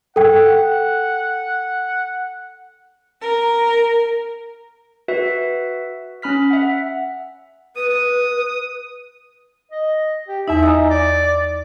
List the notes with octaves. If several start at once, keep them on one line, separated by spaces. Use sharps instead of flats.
A4 F#5 G5
A#4
F#4 B4 E5
C#4 B5 F6 B6
E5 F#5
B4 D#6
D#6
D#5
G4
E2 D#4 E5
D#4 G#5 D#6
D5